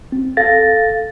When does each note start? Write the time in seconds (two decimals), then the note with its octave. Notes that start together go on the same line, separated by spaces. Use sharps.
0.12 C4
0.37 A4 F5 A6 A#6